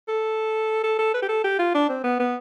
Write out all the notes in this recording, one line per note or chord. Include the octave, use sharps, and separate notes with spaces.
A4
A4
A4
B4
G4
A4
G4
F4
D4
C4
B3
B3